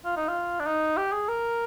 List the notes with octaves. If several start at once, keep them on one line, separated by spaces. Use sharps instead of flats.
F4
D#4
F4
D4
D#4
G4
G#4
A#4